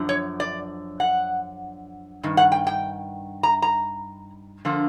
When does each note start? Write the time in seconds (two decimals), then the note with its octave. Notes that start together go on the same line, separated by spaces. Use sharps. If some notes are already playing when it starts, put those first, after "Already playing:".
Already playing: F#2 D3 F3
0.09 C#5
0.40 D5
1.00 F#5
2.23 G2 D#3
2.37 F#5
2.52 G5
2.67 G5
3.43 A#5
3.62 A#5
4.65 D3 F3 A#3